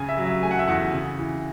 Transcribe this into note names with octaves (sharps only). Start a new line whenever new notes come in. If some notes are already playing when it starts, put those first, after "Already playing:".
Already playing: C#3 G#5
E5
F#3
E5
A3 G#5
F#5
E5
E2 F#5
C#3
E3